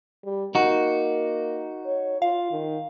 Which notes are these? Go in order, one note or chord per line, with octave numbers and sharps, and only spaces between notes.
G3
A#3 D#4 F#4
C#5
F4 F5
D#3